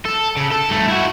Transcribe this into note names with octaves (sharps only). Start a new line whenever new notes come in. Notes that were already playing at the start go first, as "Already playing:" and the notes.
A4
C#3
A4
G2 A3
E4 F#4